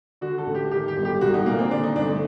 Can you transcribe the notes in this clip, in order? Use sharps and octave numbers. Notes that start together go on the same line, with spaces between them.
D3 F#4
A4
A1
G4
D#3 G4
G4
G1
G4
C2 F#4
D#4
A#2 A#3
C4
D3 D4
D#4
G1 D4
A3